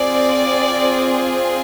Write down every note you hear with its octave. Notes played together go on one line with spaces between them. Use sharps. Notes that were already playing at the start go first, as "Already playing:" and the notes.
Already playing: C4 F4 G#4 D5